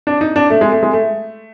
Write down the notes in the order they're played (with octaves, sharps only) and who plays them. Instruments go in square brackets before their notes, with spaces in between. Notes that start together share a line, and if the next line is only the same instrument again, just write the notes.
[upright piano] D4
D#4
D4
A3
G#3
A3
G#3
A3